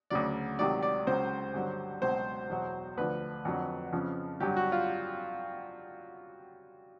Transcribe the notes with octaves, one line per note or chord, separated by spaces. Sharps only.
D2 C#3 F#3 D5
C#2 C3 D#3 F#3 D5
D5
C#2 C#3 F#3 C5
G2 D3 F#3
C#2 B2 F#3 C5
E2 B2 F#3
D2 D3 F3 B4
F2 D3 F#3
F2 C#3 F3
G2 D3 F#3 G4
F#4
F4